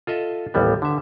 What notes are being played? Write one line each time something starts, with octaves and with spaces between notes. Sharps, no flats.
F4 A4 D#5 E5
A1 D#2 G3 B3
D3 E5